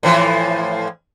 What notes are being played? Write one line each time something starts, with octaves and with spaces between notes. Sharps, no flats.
A2 E3 F3